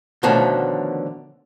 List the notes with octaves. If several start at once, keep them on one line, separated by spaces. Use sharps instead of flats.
B2 D3 D#3 F3 A3 C#4